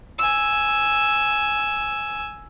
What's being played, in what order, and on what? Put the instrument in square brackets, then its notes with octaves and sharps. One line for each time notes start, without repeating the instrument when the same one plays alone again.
[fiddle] G#5 E6